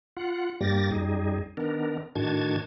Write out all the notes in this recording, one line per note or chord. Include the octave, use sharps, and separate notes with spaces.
F4 F#5
G2 G3 A#3 G4 A6 A#6
F#2 G3 D#4 G#4
D#3 B3 D4 A#4
A2 D#3 D4 F#4 A5 G#6